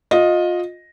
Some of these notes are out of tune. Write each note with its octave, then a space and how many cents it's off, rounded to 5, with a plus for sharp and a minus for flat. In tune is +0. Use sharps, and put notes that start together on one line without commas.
F4 +25 D#5 +0